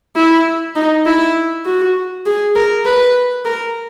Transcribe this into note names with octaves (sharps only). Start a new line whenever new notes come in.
E4
D#4
E4
F#4
G#4
A#4
B4
A#4